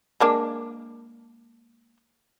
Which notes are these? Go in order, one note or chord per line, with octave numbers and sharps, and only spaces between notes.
G#3 A#3 D4